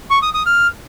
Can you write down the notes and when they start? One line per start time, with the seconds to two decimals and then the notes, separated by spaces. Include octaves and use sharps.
0.10 C#6
0.22 D#6
0.34 D#6
0.46 F6